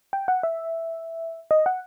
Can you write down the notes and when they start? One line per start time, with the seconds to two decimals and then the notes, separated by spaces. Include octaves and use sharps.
0.13 G5
0.28 F#5
0.43 E5
1.51 D#5
1.66 F#5